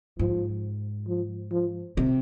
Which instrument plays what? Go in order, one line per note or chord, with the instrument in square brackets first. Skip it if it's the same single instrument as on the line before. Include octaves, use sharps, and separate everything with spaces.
[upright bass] G#2 [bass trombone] F3
[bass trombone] F3
F3
[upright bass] C3